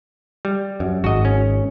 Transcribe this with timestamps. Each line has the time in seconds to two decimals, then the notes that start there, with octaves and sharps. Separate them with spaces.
0.45 G3
0.80 F#2
1.04 G#1 F#4 D#5
1.25 C#4